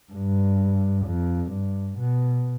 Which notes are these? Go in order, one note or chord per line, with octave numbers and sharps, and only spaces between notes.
G2
F2
G2
B2